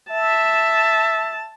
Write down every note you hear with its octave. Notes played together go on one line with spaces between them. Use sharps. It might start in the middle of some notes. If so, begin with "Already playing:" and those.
E5 A5